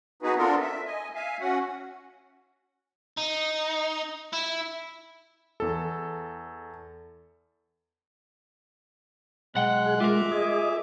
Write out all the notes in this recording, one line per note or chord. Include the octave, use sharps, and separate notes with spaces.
B3 D#4 F#4 G#4 B4
B3 C4 D4 F4 A4 A#4
E5
D#5 G#5
E5 F5 G#5
C#4 F#4 F#5
D#4
E4
E2 A4
B1 G#3 F#5 G5 F#6
G#4
G#3 F4 A#4 E5 D6
G#4 D#5